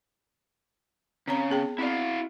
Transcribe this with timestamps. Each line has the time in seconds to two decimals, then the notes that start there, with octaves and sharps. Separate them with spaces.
1.27 C#3 C4 C#5 A#5
1.50 B3 G#4 G5
1.78 C4 E4 F#4 D5 F5